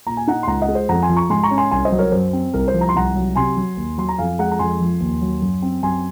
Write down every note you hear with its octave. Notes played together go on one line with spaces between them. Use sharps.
A#2 A#5
G#5
D#4 F#5 A#5
C6
C#2 F#5 A#5
D#5 F#5
G#3
C5
F2 F#5 A#5
G#5 C6
F3
A#5 C#6
G#2 G#5 C6
A#5 C#6
C#4
G#5 C6
C2 G#5 C6
C5 D#5
F#3
A#4 C#5
F#2 C5
C4
C2 A#4
C5
F3
A#5
C6
C2 F#5 A#5
F#3
C3 G#5 C6
F#3
D#2
F#3 C6
A#5
F2 F5 G#5
G#3 F#5 A#5
A#5
F2 G#5 C6
F3
D#2
F#3
F#2
C4
F#2 G#5 C6